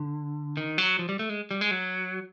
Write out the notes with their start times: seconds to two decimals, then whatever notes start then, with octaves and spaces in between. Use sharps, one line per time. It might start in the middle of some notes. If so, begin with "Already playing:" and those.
Already playing: D3
0.57 D#3
0.78 F#3
0.99 F3
1.09 G3
1.19 A3
1.29 G#3
1.51 G3
1.61 G#3
1.71 F#3